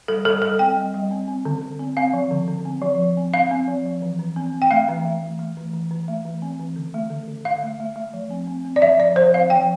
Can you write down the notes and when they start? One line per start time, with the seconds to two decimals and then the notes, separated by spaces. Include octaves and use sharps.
0.08 G3 A4
0.25 G3 A4
0.42 G3 A4
0.59 C4 G5
0.76 G3
0.94 G3
1.11 C4
1.28 C4
1.45 D3
1.62 D3
1.79 C4
1.97 C4 F5
2.13 F3
2.31 D3
2.48 D3
2.65 C4
2.82 F3
2.99 F3
3.17 C4
3.34 C4 F5
3.51 C4
3.68 F3
3.86 F3
4.02 E3
4.19 E3
4.36 C4
4.54 C4
4.62 G5
4.71 A3 F5
4.89 E3
5.05 A3
5.23 E3
5.39 A3
5.57 E3
5.73 E3
5.91 E3
6.08 A3
6.25 E3
6.42 C4
6.60 E3
6.76 D3
6.94 A3
7.10 D3
7.28 D3
7.45 D3 F5
7.63 A3
7.80 A3
7.96 A3
8.13 F3
8.31 C4
8.47 C4
8.65 C4
8.76 D5
8.82 F3 E5
8.99 F3 D5
9.16 F3 C5
9.33 C4 F5
9.50 F3 G5